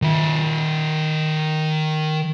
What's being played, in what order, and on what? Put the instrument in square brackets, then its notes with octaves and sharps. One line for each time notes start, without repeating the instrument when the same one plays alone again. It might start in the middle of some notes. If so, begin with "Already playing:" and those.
[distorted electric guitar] D#3 E5